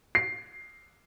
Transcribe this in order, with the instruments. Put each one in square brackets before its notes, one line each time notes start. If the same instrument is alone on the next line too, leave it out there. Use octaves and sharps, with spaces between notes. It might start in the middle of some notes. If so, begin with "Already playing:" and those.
[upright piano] C7